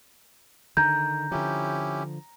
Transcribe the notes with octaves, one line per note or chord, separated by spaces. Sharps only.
D3 D#3 A#5 G6
D3 F3 C#4 E4 G4